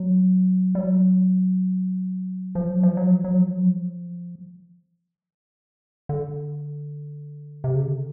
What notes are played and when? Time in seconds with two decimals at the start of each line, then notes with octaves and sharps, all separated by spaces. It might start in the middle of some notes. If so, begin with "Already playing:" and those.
Already playing: F#3
0.75 G3
0.79 F#3
2.55 F3
2.70 F#3
2.83 F3
2.97 F#3
3.11 F3
3.24 F#3
3.38 F3
3.52 F#3
3.66 F3
6.09 D3
7.64 C3
7.75 C#3
7.86 D3